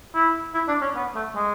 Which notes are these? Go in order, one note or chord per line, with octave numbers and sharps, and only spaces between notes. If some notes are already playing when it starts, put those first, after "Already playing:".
E4
E4
D4
C#4
B3
A3
G#3